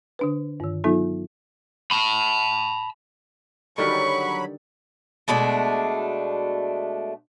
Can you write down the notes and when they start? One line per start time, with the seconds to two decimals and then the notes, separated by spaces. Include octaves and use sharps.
0.19 D3 D4 B4
0.60 G2 D#3
0.84 F#3 B3 D#4 F4 A4
1.91 A5 B5
3.78 D3 D#3 F#3 G3 B5 C#6
5.28 B2 G#3 A3 D4